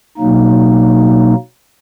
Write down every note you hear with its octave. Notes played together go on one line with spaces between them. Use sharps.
B2 F#3 A#3 D#4